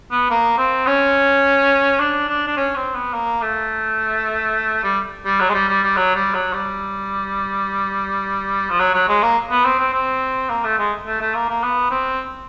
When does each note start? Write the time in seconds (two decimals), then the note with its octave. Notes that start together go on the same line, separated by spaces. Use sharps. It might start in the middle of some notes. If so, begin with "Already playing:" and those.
0.11 B3
0.30 A#3
0.58 C4
0.87 C#4
2.00 D4
2.29 D4
2.47 D4
2.57 C#4
2.76 C4
2.95 B3
3.13 A#3
3.42 A3
4.84 G3
5.25 G3
5.41 F#3
5.49 G#3
5.54 G3
5.68 G3
5.83 G3
5.97 F#3
6.15 G3
6.34 F#3
6.53 G3
8.70 F3
8.80 F#3
8.94 F#3
9.09 G#3
9.23 A#3
9.50 B3
9.65 C4
9.79 C4
9.93 C4
10.50 A#3
10.64 A3
10.78 G#3
11.06 A3
11.21 A3
11.35 A#3
11.49 A#3
11.63 B3
11.91 C4